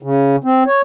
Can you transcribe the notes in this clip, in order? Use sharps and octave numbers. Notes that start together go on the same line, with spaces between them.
C#3
C4
C#5